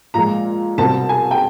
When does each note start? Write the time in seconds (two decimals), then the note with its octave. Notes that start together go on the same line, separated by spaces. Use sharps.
0.14 A#2 F3 G#3 A#5
0.78 C2 B2 G3 C4 A5
1.09 G#5
1.31 G5